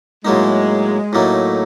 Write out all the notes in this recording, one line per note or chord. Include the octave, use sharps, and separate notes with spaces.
A2 F#3 G#3 A#3 D#4
A2 F#3 A3 A#3 D#4